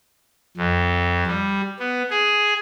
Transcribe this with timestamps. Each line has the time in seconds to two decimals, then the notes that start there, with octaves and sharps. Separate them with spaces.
0.57 F2
1.27 G3
1.79 B3
2.10 G#4